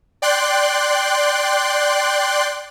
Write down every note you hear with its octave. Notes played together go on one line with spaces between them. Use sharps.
D5 G5 C6 F#6